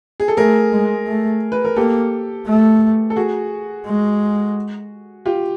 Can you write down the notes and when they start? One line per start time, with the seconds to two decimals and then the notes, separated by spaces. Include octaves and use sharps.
0.20 G#4
0.28 A4
0.37 A3 G#4 A#4
0.73 G#3
1.07 A3
1.52 B4
1.65 A#4
1.77 A#3 G4 A4
2.47 A3
3.10 A4
3.16 F#4 G#4
3.86 G#3
5.26 F4 G4